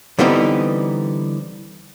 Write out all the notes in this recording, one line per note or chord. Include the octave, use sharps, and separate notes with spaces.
D3 E3 G3 B3 C4 D#4